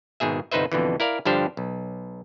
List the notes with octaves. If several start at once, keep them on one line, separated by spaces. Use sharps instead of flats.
G#1 G#2 B2 G#4 E5
G1 C2 D#4 B4 C5 E5
F2 B2 D3 E3
E4 A#4 D5 F5
G2 D3 F3 D4 G4 C5
B1